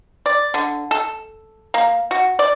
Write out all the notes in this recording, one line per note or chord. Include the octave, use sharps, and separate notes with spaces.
D5
D3
A4
A#3
F#4
D5